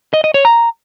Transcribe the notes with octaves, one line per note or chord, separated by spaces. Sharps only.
D#5
D#5
C#5
A#5